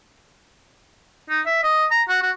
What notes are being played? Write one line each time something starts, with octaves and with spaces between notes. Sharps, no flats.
D#4
E5
D#5
A#5
F#4
F#4